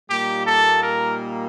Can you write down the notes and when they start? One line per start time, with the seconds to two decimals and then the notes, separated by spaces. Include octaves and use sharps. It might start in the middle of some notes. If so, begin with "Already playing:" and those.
0.10 A#2 G3 A#3 D#4 G4
0.47 A4
0.83 A#4